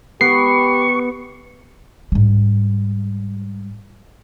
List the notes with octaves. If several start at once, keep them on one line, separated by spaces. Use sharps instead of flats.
B3 G4 C#6 C7
G#2 G3